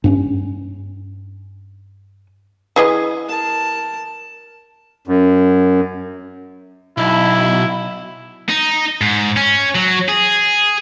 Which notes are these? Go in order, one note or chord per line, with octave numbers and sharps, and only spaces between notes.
G2 C4 C#4
E3 G#4 D#5
A#4 A5
F#2
B1 E4
D#4
G#2
C#4
F#3
G#4